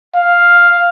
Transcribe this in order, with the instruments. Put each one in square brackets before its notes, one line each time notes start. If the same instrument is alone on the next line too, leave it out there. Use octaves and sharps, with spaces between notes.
[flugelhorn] F5